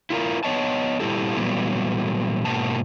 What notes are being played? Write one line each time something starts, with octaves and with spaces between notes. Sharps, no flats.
E4 F4 A#4
B3 C#5 D#5 A5
A#2 G3 E4 G4 A4
A#2 E3 F#3 G3 A3 B3
G#2 B2 A#3 A5